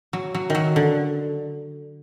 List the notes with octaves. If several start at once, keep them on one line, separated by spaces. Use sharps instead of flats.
F#3
F#3
D#3 F#3
D3